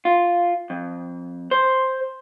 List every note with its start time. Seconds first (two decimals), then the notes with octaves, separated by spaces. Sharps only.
0.05 F4
0.70 F2
1.51 C5